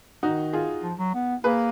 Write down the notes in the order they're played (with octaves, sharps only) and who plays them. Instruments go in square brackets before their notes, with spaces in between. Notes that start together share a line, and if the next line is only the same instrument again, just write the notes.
[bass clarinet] D#3 [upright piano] D#4 F#4
[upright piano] F4 G#4
[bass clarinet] F3
F#3
B3
[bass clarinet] A#3 [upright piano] G#4 B4